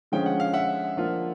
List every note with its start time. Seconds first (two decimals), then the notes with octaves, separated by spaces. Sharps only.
0.12 D3 F3 G#3 C#4 G5
0.26 F#5
0.40 F5
0.53 E5 F#5
0.97 F3 A#3 D4 F4